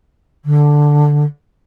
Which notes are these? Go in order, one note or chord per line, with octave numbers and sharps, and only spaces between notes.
D3